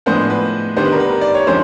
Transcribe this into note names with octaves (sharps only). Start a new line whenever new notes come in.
A2 F3 G#3 B3 D4 C5
B4
D#3 G3 B3 D4 C5
B4
A#4
B4
D5
C#5
D3 F3 G#3 C#4 C5